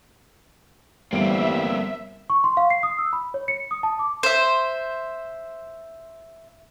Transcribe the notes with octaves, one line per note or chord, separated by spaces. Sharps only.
G1 E3 G3 A3 A#3 C4 E5 D7
C#6
C6
F5
C7
D#6
E6
B5
C#5
C#7
D#6
A5
D6
C5 E5